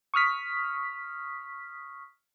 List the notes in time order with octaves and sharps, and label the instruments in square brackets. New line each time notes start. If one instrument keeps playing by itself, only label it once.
[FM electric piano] C#6 D#6 F6 B6